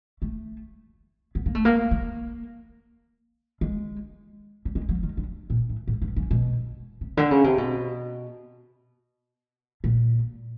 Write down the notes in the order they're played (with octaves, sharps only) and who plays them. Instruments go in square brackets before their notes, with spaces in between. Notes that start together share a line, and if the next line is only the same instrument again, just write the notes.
[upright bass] A3
B3
A#3
A3
A#3
A#3
G#3
G3
G#3
F#3
D#3
D3
A#2
A2
G#2
G2
F#2
B2
C3
D3
C#3
C3
B2
A#2